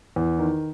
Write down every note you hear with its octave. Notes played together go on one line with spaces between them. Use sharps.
E2
D#3